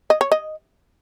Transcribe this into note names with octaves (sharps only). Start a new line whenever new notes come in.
D#5
C#5
D#5